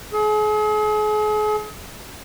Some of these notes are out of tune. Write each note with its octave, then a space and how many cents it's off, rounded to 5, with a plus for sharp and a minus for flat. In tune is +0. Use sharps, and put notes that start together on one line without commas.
G#4 +40